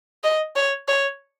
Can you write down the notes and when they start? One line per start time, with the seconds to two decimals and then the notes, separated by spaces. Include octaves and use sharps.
0.23 D#5
0.56 C#5
0.88 C#5